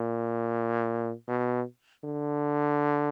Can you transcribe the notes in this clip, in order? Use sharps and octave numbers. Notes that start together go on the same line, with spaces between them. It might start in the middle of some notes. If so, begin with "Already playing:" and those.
Already playing: A#2
B2
D3